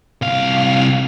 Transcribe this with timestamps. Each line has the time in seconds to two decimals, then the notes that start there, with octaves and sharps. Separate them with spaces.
0.22 C2 F5